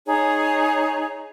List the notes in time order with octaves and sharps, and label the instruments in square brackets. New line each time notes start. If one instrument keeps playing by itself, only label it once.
[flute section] D#4 G#4 C#5